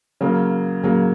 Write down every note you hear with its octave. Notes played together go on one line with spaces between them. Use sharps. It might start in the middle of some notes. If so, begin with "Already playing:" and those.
C#3 F#3 A#3
C#3 F#3 A#3